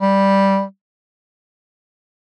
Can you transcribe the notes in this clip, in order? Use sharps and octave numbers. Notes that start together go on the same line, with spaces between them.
G3